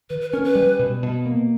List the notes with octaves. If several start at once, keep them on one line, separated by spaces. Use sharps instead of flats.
D#3 B4
B4
C#4 A#4
B4
G3
B2
B2
A#3